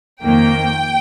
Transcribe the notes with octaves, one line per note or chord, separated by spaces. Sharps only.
F2 D#3 A#3 G5